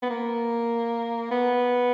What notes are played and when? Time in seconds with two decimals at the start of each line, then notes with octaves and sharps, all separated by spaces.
0.03 B3
0.10 A#3
1.31 B3